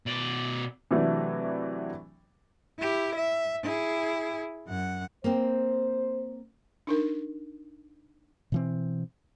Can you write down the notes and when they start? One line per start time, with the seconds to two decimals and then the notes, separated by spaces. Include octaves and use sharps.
0.06 B2 D5
0.91 C3 E3 F#3 A3 D4
2.79 E4 G4
3.16 E5
3.63 E4 G#4
4.67 F#2 F#5
5.24 A#3 C4 C5
6.87 D4 D#4 A#4
8.52 B2 E3 C4